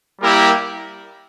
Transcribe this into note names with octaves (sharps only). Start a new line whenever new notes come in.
G3 A#3 E4 G4 A#4